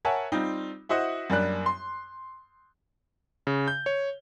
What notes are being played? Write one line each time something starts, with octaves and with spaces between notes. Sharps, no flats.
A#4 C#5 E5 F#5 G#5 A5
G3 C4 D#4 F4
E4 F#4 C5 D#5 F#5
F#2 G3 A#3 D4 F#6
C6
C#3
G6
C#5